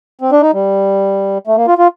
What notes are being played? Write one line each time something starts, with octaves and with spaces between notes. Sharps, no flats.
C4
D4
D#4
G3
A3
A#3
F4
F4